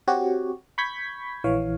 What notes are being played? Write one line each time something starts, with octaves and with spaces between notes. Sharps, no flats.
C4 F#4 G4 C#5
B5 C#6 G6 G#6 B6
A#1 E3 C#5 F5